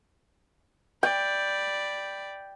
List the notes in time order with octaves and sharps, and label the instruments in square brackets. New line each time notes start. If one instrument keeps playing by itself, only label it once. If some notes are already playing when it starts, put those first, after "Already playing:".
[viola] D5 B5 [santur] G5